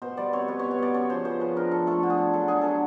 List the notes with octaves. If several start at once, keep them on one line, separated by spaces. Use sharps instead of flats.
B2 C5
G3 D5
C4 C#5
B2 B4
B2 C#5
C#5
B2 D5
C#3 C#5
F3 C5
C#3 C5
F3 B4
D4 A#4
F3 A4
A3 A4
D3
G#4
D3
F#3 A4
D4 G#4
F#3 A4